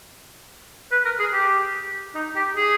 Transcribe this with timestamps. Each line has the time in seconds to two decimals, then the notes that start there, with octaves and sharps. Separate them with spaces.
0.91 B4
1.05 A#4
1.19 G#4
1.33 G4
2.15 D#4
2.36 G4
2.56 G#4